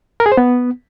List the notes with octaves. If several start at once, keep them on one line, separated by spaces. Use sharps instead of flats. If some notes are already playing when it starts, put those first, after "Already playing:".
A#4
G#4
C5
B3